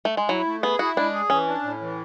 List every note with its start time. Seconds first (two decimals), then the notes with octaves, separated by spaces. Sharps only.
0.05 A3
0.17 G#3
0.29 F#3 E4
0.47 A3
0.63 B3 G#4
0.79 E4 F#4
0.96 G#3 D4
1.13 G#4
1.30 E3 C#4
1.47 D4
1.64 A2
1.81 E3